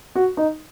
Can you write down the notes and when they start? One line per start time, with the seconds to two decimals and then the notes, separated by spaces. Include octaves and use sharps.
0.15 F#4
0.37 D#4